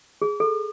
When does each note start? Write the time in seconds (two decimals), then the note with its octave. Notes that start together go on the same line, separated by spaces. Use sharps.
0.22 G#4
0.40 A4